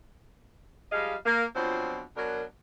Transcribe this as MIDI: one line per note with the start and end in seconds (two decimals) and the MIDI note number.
0.92 1.14 53
0.92 1.14 55
0.92 1.14 56
0.92 1.14 75
0.92 1.14 77
1.26 1.45 58
1.56 2.02 47
1.56 2.02 53
1.56 2.02 54
1.56 2.02 60
1.56 2.02 62
1.56 2.02 65
2.17 2.44 47
2.17 2.44 54
2.17 2.44 62
2.17 2.44 70